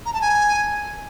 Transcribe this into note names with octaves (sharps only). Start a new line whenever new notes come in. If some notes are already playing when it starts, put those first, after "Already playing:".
A#5
A5
G#5